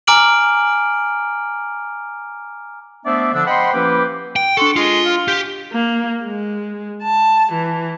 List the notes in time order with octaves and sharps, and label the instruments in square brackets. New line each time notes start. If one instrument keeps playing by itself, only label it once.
[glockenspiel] G#5 A#5 D6 F6 D7 F#7
[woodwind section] A3 B3 D4 C5 D5 E5
D3 F3 D4 E6
C5 D#5 F#5 G5 B5 C6
F3 A#3 C#4 E4 G4 B4
[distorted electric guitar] G5
[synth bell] D4 C6 C#7 [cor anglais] F#4 [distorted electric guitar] A4
[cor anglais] G#3 [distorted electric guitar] F4
[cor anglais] F5
[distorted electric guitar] G4 [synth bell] G6
[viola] A#3
G#3
A5
E3